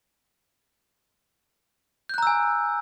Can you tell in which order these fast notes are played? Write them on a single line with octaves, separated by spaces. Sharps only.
G6 F#6 A#5 E6 G#5